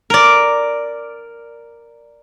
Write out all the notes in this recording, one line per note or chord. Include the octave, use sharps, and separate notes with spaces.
A#4 D5